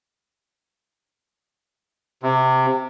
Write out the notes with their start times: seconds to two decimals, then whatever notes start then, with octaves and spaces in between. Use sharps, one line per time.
2.23 C3